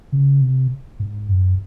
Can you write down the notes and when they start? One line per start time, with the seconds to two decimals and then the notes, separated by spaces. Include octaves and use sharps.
0.12 C#3
0.41 C3
1.00 G#2
1.29 F#2